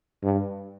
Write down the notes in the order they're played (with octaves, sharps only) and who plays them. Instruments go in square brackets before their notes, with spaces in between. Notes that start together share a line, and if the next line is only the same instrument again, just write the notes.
[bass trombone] G2